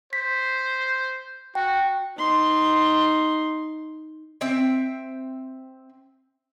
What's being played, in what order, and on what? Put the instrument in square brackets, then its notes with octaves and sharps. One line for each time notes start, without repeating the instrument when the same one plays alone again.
[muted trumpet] C5 [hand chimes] B6
[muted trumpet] F#4 [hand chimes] G5
[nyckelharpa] D#4 C6
[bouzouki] C4 E5 G5